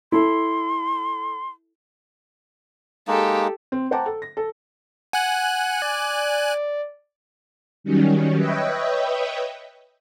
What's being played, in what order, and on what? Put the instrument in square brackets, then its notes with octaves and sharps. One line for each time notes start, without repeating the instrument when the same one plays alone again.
[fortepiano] E4 A4 [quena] C6
[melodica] G#3 A#3 D#4 [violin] G4 A4
[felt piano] C4
C5 F#5 G5 A5 A#5 D6
A4
A#6
A4
[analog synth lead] F#5 [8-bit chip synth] G#5 F#6
[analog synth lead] D5
[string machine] D#3 F#3 G3 C#4
B4 C#5 D#5 E5 G5